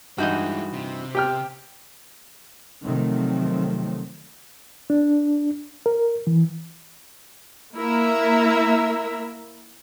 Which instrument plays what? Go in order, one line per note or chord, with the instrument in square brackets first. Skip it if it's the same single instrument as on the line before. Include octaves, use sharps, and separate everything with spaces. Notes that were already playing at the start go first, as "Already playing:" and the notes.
[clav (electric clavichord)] G2 D#5 [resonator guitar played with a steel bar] E3 D#4 F#4 [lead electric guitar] G#3 E4
[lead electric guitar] C3
[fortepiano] G4 G5 F6
[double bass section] C3 D#3 F3 F#3 A3 C4
[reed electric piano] D4
A#4
E3
[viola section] A#3 E4 A#4 E5